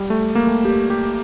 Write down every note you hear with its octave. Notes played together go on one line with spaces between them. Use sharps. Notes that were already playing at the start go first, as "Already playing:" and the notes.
Already playing: G3
A3
A#3
A3
G4
G4